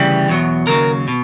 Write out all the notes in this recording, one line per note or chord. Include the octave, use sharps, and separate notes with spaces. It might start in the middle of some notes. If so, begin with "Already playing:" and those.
Already playing: D2 C#3 E3 G3
E2 B2 F#3
D#2 C#3 F#3 A#4
B2